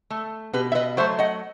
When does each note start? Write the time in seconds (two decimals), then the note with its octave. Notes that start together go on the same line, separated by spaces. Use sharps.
0.10 A3
0.53 B2 G4 B4
0.72 E5
0.75 B4 D#5
0.97 F#3 A3 C5 E5
1.19 D#5 F#5